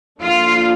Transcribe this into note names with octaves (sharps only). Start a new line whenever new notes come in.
D3 F3 A#3 D4 F4